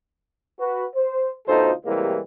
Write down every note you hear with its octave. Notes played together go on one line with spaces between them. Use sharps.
F#4 B4
C5
D2 B2 D#4 F4 A4 C5
A2 C3 E3 G3 G#3 A#3